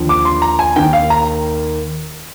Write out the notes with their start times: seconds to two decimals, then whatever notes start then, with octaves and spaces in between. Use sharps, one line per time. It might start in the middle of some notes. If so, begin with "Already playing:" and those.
Already playing: D#2 D3 F3
0.09 D6
0.25 C6
0.42 A#5
0.59 G#5
0.76 D#2 D#3 G5
0.93 F5
1.10 A#5